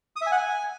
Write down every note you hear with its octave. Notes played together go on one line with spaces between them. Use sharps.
D#6
E5
G#5
F#5
G#5